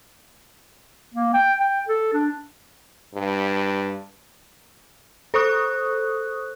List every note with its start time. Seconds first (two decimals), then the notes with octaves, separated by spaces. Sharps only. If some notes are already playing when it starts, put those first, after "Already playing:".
1.14 A#3
1.34 G5
1.60 G5
1.88 A4
2.14 D4
3.14 G2
5.34 A4 C5 C#6 D#6 F#6